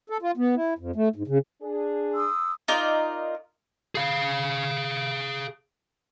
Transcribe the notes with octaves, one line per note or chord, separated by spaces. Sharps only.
A4
F4
B3
E4
F2
A3
G#2
C#3
D4 G#4
C6 D#6 E6
D#4 F4 A#4 D5
G#4 F5